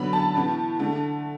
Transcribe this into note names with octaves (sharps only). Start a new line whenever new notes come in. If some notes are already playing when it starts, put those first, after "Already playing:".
Already playing: D3 F#3 B3 B5
A5
A2 E3 B3
D3 A3